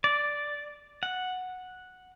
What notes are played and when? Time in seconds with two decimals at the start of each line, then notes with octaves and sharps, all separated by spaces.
0.04 D5
1.03 F#5